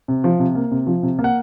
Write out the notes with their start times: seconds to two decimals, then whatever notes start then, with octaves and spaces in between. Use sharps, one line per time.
0.08 C3
0.24 F3
0.39 C3
0.55 A#3
0.71 C3
0.87 F3
1.03 C3
1.19 A#3
1.24 F#5